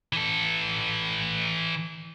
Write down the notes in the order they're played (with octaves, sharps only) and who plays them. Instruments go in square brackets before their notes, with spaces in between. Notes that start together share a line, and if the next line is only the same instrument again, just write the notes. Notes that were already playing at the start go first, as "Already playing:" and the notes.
[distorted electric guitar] E3 A4